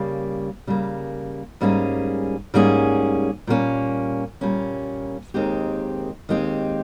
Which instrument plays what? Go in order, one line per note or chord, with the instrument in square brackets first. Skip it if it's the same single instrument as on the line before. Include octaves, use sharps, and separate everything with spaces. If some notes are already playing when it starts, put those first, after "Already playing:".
Already playing: [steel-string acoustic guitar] C#3 G3 A#3
C#3 G3 A#3
G#2 G3 A#3 C#4 G#4
G#2 G3 A#3 C#4 G#4
A#2 G3 A#3 C#4
A#2 G3 A#3 C#4
D#2 D#3 G#3 C4 G4
D#2 D#3 G#3 C4 G4